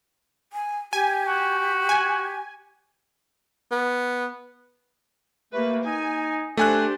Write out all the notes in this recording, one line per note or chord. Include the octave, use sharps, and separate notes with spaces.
G#5
G4 G#5
F#4
G#5
B3
A3 A#3 G4 B4
D#4 G#5
A3 D4 G4 C5 G#5 F#6